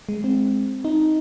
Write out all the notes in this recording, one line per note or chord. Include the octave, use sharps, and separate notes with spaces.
G#3
C4
D#4